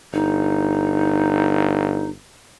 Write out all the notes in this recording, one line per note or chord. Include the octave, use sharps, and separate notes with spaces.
G1 D#4